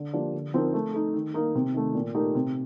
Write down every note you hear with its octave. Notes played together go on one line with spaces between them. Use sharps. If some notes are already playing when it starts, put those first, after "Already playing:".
Already playing: D3
F3 A#3 D4 G4
D3
F3 C4 D#4 A#4
A3
D#4 A4
D#3
A#3 D#4 A#4
C3
D#3 A3
A#2
A3 D#4 G4 A#4
C3